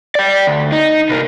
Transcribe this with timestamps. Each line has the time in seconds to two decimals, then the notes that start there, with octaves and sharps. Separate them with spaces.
0.15 D5 G5
0.47 D2
0.72 D#4
1.10 C2 A#3